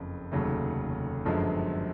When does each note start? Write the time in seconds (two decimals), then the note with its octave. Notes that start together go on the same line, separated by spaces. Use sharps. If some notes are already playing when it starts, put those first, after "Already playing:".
Already playing: F#1 F2 C#3
0.32 F1 D#2 C#3 F#3 A3
1.25 G1 F#2 D3 F3 G#3